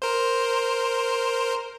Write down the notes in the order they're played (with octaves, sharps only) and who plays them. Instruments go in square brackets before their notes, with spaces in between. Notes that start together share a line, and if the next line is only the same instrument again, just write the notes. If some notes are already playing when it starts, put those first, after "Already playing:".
[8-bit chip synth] A#4 C5